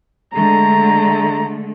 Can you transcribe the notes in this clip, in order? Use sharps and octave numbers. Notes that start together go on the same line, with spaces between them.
D3 G#3 A3 A#5